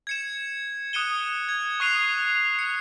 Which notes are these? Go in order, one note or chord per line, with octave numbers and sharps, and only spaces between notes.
G#6 C#7 E7
D#6 F#6 C#7 D#7 E7 G7
G#6
C#6 D#6 F#6 C7 D#7 F7
C#7